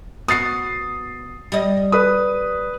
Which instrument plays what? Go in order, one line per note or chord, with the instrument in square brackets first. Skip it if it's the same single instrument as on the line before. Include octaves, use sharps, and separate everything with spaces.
[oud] B3 F#4 [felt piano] D#6 A6 C7
[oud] G3 D#5
[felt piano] B4 D#6